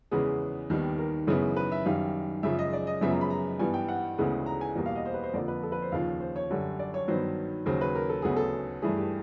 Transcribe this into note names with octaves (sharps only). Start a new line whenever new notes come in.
E2 C#3 E3 G#3 B3 G#4
D#2 D#3 G3 B3
A#4
F#2 C#3 E3 G#3 B3
B4
E5
F#2 D#3 G3 F5
F#2 C#3 F3 G#3 E5
D#5
D5
D#5
F#2 C#3 F3 G#3 B3 E5
A#5
B5
A#5
G2 E3 G3 B3 G#5
G5
F#5
D2 C#3 E3 G#3 B3
A#5
G#5
E2 B2 G3 A#3
F5
D#5
C5
B4
C5
F2 D3 F3 A#3 D5
B4
A4
B4
C5
D#2 C#3 F3 F5
C5
C#5
F#2 D3 G3
D5
C#5
G2 D#3 F#3 B3 C5
D#2 C#3 F#3 C5
B4
A#4
A4
D2 C#3 F#3 B3 G#4
A4
G2 E3 A3 G#4
G4